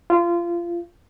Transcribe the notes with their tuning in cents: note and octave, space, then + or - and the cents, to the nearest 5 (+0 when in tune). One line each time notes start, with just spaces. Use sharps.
F4 -25